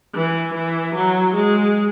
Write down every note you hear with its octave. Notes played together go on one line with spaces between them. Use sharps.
E3
E3
F#3
G#3